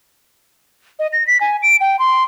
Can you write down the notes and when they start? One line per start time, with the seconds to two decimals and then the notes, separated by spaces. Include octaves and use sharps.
0.99 D#5
1.13 A#6
1.27 B6
1.41 G#5
1.63 D7
1.81 G5
1.99 C6